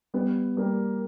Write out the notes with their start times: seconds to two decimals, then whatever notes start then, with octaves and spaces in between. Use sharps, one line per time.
0.14 G3 B3
0.57 G3 A#3